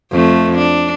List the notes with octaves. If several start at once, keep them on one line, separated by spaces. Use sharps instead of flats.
F2 A3
D4